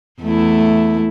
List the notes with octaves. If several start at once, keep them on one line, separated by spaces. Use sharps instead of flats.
E2 A3 E4